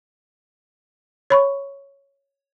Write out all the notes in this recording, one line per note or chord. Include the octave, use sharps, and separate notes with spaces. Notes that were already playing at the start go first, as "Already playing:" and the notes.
C#5 B5 C#6